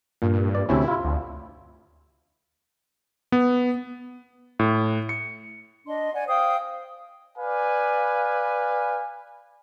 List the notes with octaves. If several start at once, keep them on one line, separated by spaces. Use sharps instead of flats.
G2 A#2
D5
D2 C3 C#4 E4
F4
D2
B3
A2
C#7
D4 D#5 C6
D5 F#5 G#5
C5 F5 G5 D#6
B4 D5 F5 G#5